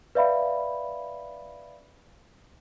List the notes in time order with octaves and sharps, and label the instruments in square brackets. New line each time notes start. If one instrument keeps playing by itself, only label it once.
[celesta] B4 D5 E5 F5 B5